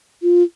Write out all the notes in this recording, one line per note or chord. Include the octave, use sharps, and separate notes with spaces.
F4